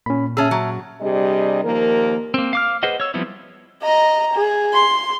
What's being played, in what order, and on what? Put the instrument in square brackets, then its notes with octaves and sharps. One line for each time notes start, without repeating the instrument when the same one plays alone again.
[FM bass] A#2 [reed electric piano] C#4 B5
[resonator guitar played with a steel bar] C#4 G#4 [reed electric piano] E5 A5 E6
[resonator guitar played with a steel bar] F#3
[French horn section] C3 G3 D4 G#4 D#5
D#2 F3 A#3 A#4
[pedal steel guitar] A#3 C4
F5 D6 F6
G#4 B4 C5 D#5 F#5
C#5 E6
F3 G3 B3 C4 E4
[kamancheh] D#5 A#5
G#4
C6